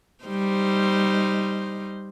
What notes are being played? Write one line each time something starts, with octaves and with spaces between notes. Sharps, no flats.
G3 D#4 C5